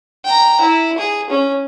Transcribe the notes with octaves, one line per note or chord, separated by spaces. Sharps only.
G5 A#5
E4
G#4
C#4